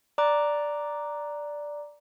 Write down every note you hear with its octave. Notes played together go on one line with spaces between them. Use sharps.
D5 A#5 D6 F#6